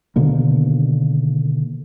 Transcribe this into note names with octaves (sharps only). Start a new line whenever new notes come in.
B2 D3 D#3 A#3